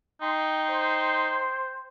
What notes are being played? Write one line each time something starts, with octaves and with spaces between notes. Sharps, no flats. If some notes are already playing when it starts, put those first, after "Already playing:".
D#4 G5 C6
C5